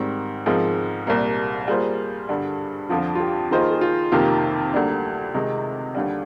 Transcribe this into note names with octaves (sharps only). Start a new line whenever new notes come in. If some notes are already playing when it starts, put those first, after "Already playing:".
Already playing: G#2 D#3 G3 C4
G#2 F3 G#3 C4 A#4
C2 A#2 G3 A#3
G3 A#3 F4 G#4 C5
G2 D3 G3
F2 D3 F3 F4
F4
G4
D#3 A#3 F4 G#4 C5 D#5
A#4
G#4
F4
F2 C3 D#3 A#3 F4 G4
D2 D3 G3 A#3 D4
C3 D#3 G#3 D#4
D#2 D3 G3